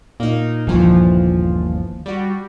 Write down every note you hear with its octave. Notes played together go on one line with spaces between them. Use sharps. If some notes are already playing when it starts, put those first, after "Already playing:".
A#2 A#3 D#4
G1 D#2 D3 E3 F3
G3 F#4